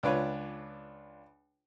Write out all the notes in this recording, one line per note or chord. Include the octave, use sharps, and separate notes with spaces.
C#2 D4 F4 B4 C#5